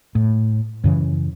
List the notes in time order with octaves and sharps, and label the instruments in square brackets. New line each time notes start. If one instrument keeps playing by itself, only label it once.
[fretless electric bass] A2
F#2 C#3 E3